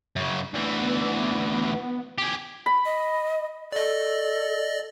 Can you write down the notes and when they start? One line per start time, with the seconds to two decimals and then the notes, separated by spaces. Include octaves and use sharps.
0.16 F#2 C#3
0.54 D2 E3
0.79 B3
2.18 G4 G#4
2.66 B5
2.85 D#5
3.72 A4 D5 D#5